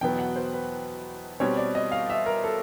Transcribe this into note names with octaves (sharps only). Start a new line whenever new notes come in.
E2 B2 F#3 B3 G5
F#5
C5
B4
B2 G3 C4 C#5
D5
D#5
F5
E5
A#4
A4